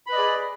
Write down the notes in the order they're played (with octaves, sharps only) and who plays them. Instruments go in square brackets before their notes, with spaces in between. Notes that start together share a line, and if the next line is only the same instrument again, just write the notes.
[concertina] B5
B4
D#5
D5
G#4